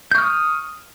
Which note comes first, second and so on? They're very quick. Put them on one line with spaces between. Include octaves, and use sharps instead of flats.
G6 C#6 F6 D#6